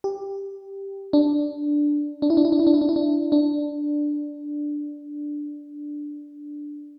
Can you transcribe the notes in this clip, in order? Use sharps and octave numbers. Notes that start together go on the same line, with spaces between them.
G4
D4
D4
E4
D4
E4
D4
E4
D4
E4
D4
E4
D4
D4